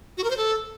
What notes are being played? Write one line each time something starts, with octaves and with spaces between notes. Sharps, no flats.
F#4
A#4
C5
A4